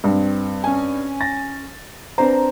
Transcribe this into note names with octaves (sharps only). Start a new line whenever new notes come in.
G2 C4
C#4 G#5
A6 A#6
C4 D4 B4 C5 A#5